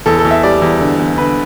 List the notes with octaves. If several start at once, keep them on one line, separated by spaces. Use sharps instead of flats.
E2 A4
A4
E2
E5
G3 D5
E2
D3
E2
D3 B4